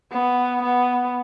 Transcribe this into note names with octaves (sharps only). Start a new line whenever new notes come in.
B3
B3